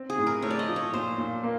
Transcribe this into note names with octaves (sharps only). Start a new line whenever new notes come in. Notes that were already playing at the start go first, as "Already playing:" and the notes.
Already playing: C4
G#4
A2
A#4
A3 C#5
D5
D#5
F3
C#5
A#2 C5
A#2
A#3